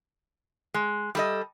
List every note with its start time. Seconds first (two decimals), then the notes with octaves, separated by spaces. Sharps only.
0.74 G#3
1.15 G3 A4 D#5